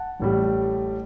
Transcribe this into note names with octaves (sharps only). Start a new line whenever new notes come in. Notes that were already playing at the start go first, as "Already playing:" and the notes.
Already playing: F#5 A5
A1 A2 G3